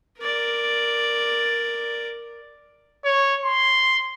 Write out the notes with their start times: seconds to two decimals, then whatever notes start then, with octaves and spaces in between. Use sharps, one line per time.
0.19 A#4 D5
3.05 C#5
3.45 C6